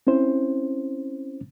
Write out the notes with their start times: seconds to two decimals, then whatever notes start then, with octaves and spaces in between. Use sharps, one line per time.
0.07 C4 C#4 E4 C5